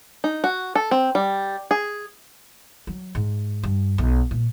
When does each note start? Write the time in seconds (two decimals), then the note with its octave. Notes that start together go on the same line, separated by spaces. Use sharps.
0.24 D#4
0.44 F#4
0.75 A4
0.91 C4
1.15 G3
1.71 G#4
2.87 F#3
3.15 G#2
3.63 G2
3.98 B1
4.31 A#2